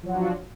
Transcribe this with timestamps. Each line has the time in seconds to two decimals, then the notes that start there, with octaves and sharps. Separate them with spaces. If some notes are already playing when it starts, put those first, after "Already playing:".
0.03 F3
0.06 F#3
0.09 F#4
0.11 F4
0.14 D4